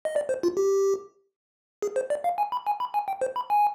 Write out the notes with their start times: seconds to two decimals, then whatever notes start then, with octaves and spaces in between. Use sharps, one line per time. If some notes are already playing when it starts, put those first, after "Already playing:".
0.05 D#5
0.16 D5
0.29 C5
0.43 F4
0.57 G4
1.82 G#4
1.96 C5
2.10 D5
2.24 F5
2.38 G#5
2.52 B5
2.67 G#5
2.80 B5
2.94 G#5
3.08 G5
3.21 C5
3.36 B5
3.50 G#5